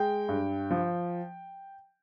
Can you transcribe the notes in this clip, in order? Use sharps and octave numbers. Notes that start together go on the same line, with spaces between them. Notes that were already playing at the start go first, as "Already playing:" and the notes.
Already playing: G#3 G5
G2
F3